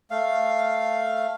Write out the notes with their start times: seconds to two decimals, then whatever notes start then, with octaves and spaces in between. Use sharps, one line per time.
0.11 A3 F5